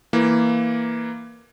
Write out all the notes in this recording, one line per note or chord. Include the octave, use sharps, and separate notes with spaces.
E3 A#3